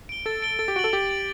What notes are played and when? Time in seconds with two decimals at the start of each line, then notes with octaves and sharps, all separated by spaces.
0.09 D7 G7
0.26 A4 A6
0.42 D7 G7
0.59 A4 A6
0.68 G4
0.76 F#4 D7
0.79 F#7
0.84 A4
0.93 G4 A6
1.09 D7 F#7